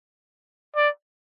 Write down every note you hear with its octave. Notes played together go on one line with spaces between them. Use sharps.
D5